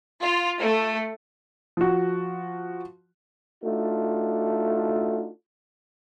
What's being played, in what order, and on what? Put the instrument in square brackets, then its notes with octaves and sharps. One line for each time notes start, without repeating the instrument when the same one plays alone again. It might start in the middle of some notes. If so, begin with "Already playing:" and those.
[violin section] F4
A3
[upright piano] F3 F#4
[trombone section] A3 D4 D#4 F4 F#4